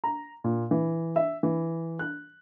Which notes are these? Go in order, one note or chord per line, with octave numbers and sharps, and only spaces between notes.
A#5
A#2
E3
E5
E3
F#6